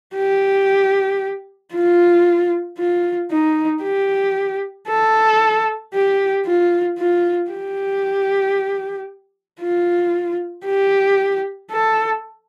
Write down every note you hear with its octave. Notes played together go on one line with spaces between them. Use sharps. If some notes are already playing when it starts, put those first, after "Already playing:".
G4
F4
F4
D#4
G4
A4
G4
F4
F4
G4
F4
G4
A4